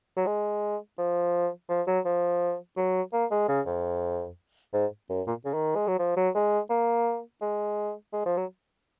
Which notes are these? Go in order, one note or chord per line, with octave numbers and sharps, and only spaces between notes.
F#3
G#3
F3
F3
F#3
F3
F#3
A#3
G#3
C#3
F2
G#2
F#2
A#2
C#3
D#3
G#3
F#3
F3
F#3
G#3
A#3
G#3
G#3
F3
F#3